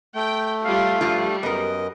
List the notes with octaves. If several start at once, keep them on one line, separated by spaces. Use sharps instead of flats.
A3 G5
G3 F4 F5
G2 F3 G3 F4
F#2 B3 A#4 D#5